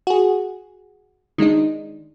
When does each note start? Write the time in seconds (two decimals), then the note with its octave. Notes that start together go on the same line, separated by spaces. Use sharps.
0.07 F#4 G#4
1.38 D#3 G#3 D4 D#4